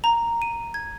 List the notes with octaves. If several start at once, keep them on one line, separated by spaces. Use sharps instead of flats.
A#5
D#7
G#6